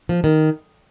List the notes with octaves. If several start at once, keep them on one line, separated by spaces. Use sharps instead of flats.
F3
D#3